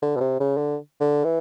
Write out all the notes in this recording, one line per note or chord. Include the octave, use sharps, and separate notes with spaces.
D3
B2
C3
C#3
D3
D3
E3